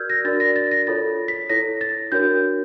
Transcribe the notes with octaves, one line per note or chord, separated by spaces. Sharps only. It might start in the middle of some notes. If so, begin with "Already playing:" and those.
Already playing: F#4 A#4 D5 E6 F6 G6 G#6
A#6
D4 F#4 A#4 D5 A6
A#6
A6
A#6
F4 A4 C#5 A6
B6
E4 A4 C#5 A#6
A6
D4 F#4 A#4 C#5 G6